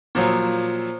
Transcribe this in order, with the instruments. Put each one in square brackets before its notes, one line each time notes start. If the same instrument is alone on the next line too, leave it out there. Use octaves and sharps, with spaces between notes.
[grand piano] A#2 F3 F#3